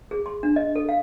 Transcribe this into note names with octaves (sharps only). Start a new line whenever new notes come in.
G#4
C6
D4
D#5
A4
F5